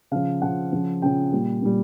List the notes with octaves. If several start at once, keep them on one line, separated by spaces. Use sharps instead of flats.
C#3 F3 F5
C#3 F3 F#5
C#3 F3
C#3 F3 G5
A#2 G3
A#2 G3